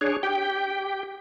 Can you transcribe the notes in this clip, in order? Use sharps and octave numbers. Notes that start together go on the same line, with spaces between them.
D4 G#4 C#5
G4 G5